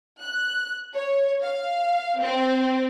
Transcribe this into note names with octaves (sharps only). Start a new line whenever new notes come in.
F#6
C#5
F5
C4